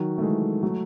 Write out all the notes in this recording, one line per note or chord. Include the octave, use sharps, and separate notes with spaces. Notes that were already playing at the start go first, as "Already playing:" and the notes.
Already playing: D#3 F#3
A3
E3 G#3
F#3 A3